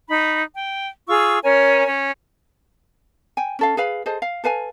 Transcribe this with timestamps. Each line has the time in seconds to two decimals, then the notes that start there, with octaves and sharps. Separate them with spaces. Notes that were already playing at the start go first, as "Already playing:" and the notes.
0.09 D#4 B5
0.54 G5
1.07 F4 G#4 C#6 E6
1.44 C#4 A#4 C#5 G#5
1.87 C#4
3.37 G5 G#5
3.59 C#4 A4 F5
3.77 G#4 B4 F5 B5
4.06 G#4 A4 C5 D#5
4.22 F5
4.44 A4 B4 F5 G#5